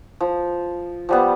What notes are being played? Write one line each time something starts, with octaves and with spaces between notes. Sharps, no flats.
F3
F3 G3 B3